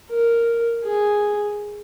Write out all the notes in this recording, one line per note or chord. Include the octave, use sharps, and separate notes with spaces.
A#4
G#4